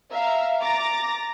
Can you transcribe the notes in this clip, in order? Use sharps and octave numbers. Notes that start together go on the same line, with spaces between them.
E5 F5 A#5
A#5 D6 A6 A#6